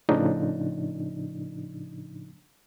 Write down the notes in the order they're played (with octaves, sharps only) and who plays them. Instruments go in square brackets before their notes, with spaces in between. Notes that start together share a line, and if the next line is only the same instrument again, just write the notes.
[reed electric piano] A2 C#3 F3 D4 D#4